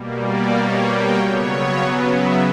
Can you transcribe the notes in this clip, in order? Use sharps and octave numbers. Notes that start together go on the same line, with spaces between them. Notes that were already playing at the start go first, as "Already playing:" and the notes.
Already playing: B2 G3 A#3
D5
C#5
G5
C#3 F#3 B3 C#5
B4
E5